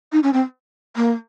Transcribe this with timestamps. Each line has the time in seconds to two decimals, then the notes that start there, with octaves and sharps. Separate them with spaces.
0.12 D#4
0.23 C#4
0.33 C4
0.96 A#3